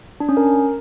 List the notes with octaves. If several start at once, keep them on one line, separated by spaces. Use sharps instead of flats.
D4
C#4
A#4